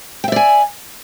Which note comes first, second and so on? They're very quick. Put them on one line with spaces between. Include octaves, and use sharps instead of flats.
G5 E5 D5 G#5